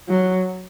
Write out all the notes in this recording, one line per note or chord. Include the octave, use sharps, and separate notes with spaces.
F#3